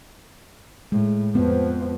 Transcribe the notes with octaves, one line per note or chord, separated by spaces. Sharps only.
A2 G#3
F2 F3 B3